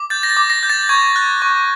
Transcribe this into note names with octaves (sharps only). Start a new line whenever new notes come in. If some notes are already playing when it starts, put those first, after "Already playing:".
Already playing: D6
G6 A6
A#6
A6
D6
A#6
G6
A6
C#6 G#6
F#6
C#6